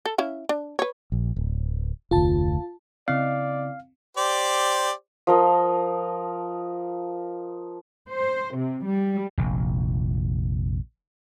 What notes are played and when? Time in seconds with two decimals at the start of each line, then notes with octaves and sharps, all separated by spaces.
0.06 A4
0.18 C#4 E4 F5
0.49 D4
0.79 B4 C#5
1.12 A#1
1.36 D1
2.11 F1 D2 F4 A5
3.08 C#3 C4 E4 D5 D#5 F5
4.17 G4 C5 D5
5.27 F3 A#4 D#5
8.09 C5
8.56 C3
8.85 G3
9.38 F1 A#1